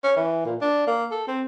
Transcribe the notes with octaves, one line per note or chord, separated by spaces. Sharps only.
C#4
E3
A#2
D4
A#3
A4
C4